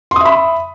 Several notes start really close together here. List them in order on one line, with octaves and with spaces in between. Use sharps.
C6 D#6 E5 B5